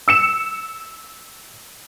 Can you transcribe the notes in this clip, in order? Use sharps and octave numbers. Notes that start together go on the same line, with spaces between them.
E6 C#7 E7